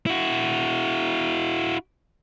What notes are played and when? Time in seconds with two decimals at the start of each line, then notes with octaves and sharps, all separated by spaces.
0.07 E4 F#4